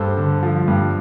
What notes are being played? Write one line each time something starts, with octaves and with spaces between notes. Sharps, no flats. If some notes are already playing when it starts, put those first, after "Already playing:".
Already playing: G2 A4 C5
D3
F3
G2